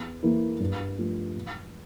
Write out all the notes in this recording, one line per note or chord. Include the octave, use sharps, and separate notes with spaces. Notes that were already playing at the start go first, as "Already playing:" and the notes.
Already playing: E2
E3 A#3 E4
G2
F3 A3
E1